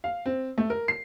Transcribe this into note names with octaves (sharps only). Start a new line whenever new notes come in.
F5
C4
A3
A#4
C7